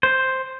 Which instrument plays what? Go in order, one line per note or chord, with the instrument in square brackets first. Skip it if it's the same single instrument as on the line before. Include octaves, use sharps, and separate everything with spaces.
[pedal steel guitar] C5